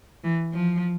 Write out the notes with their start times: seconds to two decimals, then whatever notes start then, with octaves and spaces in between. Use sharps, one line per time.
0.24 E3
0.54 F3